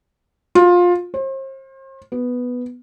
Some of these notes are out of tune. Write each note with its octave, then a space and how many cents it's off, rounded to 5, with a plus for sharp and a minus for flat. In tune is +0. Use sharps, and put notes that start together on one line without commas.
F4 +20
C5 +40
B3 +0